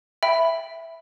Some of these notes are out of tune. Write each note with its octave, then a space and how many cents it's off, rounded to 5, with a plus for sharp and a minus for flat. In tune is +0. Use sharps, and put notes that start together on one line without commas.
E5 +0 G5 +0 B5 +0